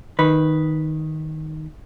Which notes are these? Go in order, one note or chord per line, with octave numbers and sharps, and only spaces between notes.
D#3 B4